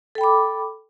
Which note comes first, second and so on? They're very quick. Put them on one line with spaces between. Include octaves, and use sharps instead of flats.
A4 G5 B5 D6